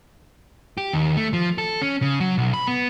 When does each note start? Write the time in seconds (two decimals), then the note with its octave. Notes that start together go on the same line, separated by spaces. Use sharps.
0.78 G4
0.93 D#2
1.17 A3
1.33 F3
1.58 A4
1.82 C#4
2.02 C#3
2.20 F#3
2.38 B1
2.54 B5
2.68 B3